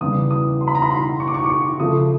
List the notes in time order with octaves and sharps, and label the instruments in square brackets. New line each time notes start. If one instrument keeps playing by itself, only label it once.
[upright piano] E2 C#3 E3 G3 D#6
D#6
C6
B5
A#5
B5
C6
C#6
D6
C#6
D6
C#6
C#3 F3 A3 D#6